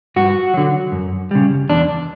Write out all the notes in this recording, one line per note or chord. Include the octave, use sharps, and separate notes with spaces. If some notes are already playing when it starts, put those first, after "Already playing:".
G2 F#4
D3 F#3
F#2
C#3 G3
E2 D4